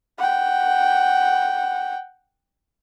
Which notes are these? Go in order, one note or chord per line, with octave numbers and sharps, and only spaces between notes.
F#5 G5